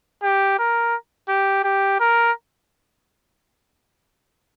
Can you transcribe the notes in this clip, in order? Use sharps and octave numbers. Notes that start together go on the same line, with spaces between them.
G4
A#4
G4
G4
A#4